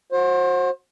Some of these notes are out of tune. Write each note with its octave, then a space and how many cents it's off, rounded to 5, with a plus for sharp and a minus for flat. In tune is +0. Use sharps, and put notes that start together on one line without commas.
F#4 -25 C5 +30